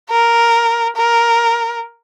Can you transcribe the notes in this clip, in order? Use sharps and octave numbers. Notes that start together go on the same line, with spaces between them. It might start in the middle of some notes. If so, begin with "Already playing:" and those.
A#4
A#4